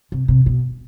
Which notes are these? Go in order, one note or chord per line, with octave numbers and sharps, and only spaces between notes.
C3
C3
B2